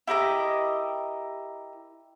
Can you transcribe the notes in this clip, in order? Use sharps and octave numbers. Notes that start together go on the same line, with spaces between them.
E4 G4 A#4 D#5